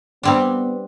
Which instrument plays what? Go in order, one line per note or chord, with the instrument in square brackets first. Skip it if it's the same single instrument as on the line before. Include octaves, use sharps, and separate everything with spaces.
[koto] G3 C4 D4 [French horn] B3